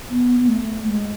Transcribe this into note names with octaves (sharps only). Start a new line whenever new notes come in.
B3
B3
A3
G#3